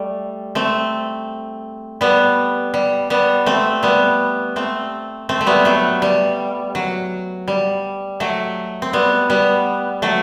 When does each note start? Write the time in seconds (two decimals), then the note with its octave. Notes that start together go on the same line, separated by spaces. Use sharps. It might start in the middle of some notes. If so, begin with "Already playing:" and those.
Already playing: G3 A3
0.55 A3 C4
2.01 G3 B3
2.74 G3
3.10 G3 B3
3.46 A3 C4
3.83 G3 B3
4.56 A3 C4
5.29 A3 C4
5.41 A3
5.46 G3 B3
5.65 F#3 A3
6.02 G3
6.75 F#3
7.48 G3
8.20 F#3 A3
8.82 C4
8.93 G3 B3
9.30 G3 B3
10.02 F#3 A3